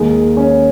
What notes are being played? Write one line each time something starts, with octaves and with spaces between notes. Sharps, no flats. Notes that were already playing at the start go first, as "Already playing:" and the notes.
Already playing: D#2 D#3 G#3 A#3
C#4